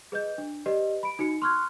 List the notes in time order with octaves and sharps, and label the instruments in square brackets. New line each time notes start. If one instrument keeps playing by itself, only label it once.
[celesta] G#4 B4 D#5 G6
D4
G4 B4 D5 D#5
B5 D7
D#4 F#4 C#7
C6 C#6 F6 F#6 G#6